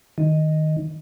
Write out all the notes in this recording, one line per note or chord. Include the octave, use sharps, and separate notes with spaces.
D#3